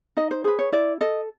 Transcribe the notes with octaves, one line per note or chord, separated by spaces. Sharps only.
D#4 D#5
C5
G#4 B4 C5
C#5
E4 D5
A4 D#5